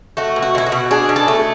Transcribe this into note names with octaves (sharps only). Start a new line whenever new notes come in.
A3 F#4
B2
F#4
B2 E4
F#4
B2
D4 G#4
B2
A4
A3